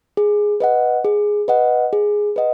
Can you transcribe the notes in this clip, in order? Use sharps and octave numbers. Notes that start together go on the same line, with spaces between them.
G#4
B4 D#5 F#5
G#4
B4 D#5 F#5
G#4
B4 D#5 F#5